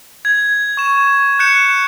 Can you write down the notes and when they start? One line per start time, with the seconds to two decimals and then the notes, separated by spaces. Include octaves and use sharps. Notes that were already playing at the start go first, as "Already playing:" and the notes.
0.25 G#6
0.77 C#6 E7
1.39 F#6 G6 C#7 E7